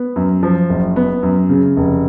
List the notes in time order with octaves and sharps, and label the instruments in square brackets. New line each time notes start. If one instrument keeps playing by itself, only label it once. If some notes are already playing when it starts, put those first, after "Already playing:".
Already playing: [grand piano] B3
F#2
F3
F#1
B3
F#2
C#3
F1